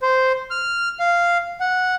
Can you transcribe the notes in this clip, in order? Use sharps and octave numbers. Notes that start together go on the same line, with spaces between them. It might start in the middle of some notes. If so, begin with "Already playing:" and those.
C5
F6
F5
F#5